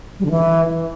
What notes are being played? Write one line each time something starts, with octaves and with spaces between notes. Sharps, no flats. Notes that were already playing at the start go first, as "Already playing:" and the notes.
G3
D3
E3